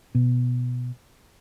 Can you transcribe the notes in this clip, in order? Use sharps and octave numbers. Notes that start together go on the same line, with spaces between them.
B2